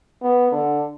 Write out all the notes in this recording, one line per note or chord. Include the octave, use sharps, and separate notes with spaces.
B3
D3